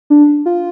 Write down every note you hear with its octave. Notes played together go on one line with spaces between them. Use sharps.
D4
F4